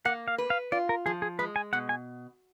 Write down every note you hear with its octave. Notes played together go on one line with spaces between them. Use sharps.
A#3 F#5
F5
B4
F5
F4 D5
A#4
F3 G#4
G#4
G#3 B4
G#5
B2 F#5
G#5